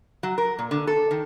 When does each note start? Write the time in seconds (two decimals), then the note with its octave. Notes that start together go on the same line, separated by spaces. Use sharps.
0.23 F#3
0.38 A#4
0.59 A#2
0.71 D3
0.87 A4
1.11 D#3